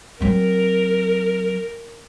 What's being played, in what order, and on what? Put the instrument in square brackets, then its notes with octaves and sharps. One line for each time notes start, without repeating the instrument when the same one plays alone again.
[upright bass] F#3 C4 [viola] A#4